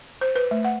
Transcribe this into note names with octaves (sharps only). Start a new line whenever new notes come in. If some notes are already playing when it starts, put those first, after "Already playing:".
C5
B4
A3
F#5